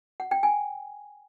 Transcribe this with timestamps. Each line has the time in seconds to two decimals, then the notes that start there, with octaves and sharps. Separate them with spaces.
0.20 F#5
0.31 G5
0.43 G#5